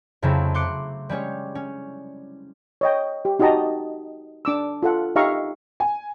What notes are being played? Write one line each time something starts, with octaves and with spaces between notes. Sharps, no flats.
F2 C#3 F#3 A3 C4 E4
C6 D6 F#6 C#7 D7
G3 G#3 C#4 C#5
C#4
C#5 D#5 G5
G4
D#4 F#4 G4 D#5 A5 A#5
D4 D6 E6
F4 A4 F#5
D#4 G4 E5 F5 A#5 C#6
G#5